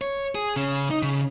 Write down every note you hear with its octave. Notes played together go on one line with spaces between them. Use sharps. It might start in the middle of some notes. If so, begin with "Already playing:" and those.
C#5
G#4
C#3 C#4
D#4
C#3